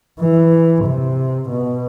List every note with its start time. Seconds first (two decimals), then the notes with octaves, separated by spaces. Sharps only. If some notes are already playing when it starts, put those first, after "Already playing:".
0.20 E3
0.85 C3
1.50 B2